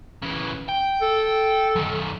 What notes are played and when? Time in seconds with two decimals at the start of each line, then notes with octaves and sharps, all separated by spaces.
0.23 C#3 E3
0.69 G5
1.02 A4
1.76 F#2 D#3